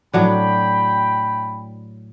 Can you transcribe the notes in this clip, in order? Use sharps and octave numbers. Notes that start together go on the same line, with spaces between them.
A2 F#3 D4 G5 B5